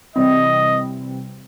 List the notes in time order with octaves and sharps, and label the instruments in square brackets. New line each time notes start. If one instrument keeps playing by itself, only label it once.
[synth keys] C3 E3 G3 C4 E4 [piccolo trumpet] D#5